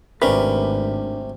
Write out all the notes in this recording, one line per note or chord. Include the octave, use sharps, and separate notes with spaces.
G#1 C3 A3 C#4 D4 A#4 B4